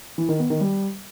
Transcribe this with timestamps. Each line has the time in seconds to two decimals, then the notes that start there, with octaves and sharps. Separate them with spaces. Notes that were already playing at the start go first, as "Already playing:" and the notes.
0.18 E3
0.29 D#3
0.39 B3
0.50 D#3
0.61 G3